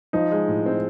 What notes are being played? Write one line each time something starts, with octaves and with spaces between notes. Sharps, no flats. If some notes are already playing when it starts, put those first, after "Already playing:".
F3 D#4
G#3
A2
C4